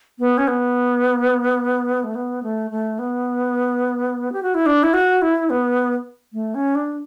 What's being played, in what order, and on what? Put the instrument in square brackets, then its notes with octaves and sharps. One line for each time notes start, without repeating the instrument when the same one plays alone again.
[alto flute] B3
C#4
B3
A3
B3
A3
A3
B3
G4
F#4
E4
D4
E4
F#4
E4
B3
A3
C#4
D4